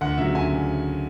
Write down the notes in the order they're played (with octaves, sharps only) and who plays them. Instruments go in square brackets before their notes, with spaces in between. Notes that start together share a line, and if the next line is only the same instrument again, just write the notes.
[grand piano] D2 F#5
C#3 F#3 E5
D2 G#5
C#3